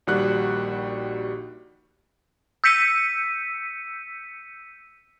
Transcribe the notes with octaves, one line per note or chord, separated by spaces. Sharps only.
A#1 D#3 G3 F#4 F#6
E6 G6 B6 C#7 D#7